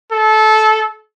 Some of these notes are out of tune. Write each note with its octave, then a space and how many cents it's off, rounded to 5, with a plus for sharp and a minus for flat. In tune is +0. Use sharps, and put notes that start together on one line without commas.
A4 -20